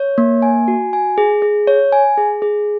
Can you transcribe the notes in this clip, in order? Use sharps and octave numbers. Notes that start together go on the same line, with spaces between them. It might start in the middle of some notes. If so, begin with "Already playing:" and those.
Already playing: C#5
A#3
G#5
F#4
G#5
G#4
G#4
C#5
G#5
G#4
G#4